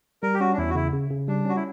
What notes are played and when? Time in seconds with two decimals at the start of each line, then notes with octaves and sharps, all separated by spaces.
0.23 G3 A#4
0.34 G4
0.40 C#4 F#4
0.53 D4
0.58 E2 E4
0.70 F#4
0.75 C#3 E4
0.93 C#3
1.10 C#3
1.28 G3 D4
1.45 C#4 F#4
1.56 E4